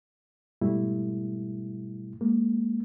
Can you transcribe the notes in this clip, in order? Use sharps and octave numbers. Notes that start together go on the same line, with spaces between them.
G#2 B2 G3 A3 E4
G#3 A#3